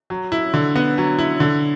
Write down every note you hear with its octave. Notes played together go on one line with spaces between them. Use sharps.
F#3
E4
D3
B3
F#3
E4
D3